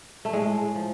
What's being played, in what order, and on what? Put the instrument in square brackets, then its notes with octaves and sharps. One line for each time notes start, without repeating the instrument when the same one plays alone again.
[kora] A3
A2 G#3
F3